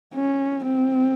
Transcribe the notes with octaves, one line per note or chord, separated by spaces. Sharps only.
C#4
C4